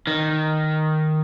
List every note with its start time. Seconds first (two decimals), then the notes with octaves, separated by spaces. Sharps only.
0.07 D#3